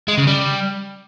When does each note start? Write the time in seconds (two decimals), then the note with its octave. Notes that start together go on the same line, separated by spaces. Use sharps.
0.08 G#3
0.18 C#3
0.27 G3